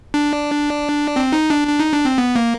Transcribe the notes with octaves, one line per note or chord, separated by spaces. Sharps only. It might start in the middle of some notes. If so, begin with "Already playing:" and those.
D4
C4
D#4
D4
D4
D#4
D4
C4
B3
A#3